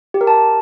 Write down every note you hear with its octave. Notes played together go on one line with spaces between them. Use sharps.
G4
A#4
A5